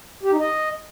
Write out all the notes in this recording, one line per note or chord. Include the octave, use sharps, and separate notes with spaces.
G4
D#4
D#5